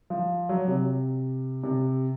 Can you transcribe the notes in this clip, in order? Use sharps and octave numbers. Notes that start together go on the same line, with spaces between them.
F3
F#3
C3
C3